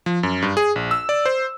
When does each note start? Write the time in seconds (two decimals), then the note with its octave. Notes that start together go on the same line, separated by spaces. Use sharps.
0.06 F3
0.23 F#2
0.42 G2
0.57 G#4
0.76 A#1
0.91 E6
1.09 D5
1.26 C5